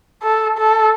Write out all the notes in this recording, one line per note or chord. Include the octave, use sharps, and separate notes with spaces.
A4
A4